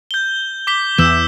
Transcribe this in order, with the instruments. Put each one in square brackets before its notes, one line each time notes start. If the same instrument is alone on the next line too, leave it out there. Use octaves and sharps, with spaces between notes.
[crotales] G6 G7
D6 B6 G7
[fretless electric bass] E2 E3 [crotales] E6 G6 E7